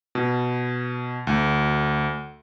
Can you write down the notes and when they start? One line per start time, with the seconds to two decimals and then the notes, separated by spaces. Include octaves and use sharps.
0.15 B2
1.27 D2